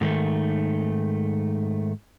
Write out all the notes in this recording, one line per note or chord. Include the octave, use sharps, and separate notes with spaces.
G#2 D#3 A3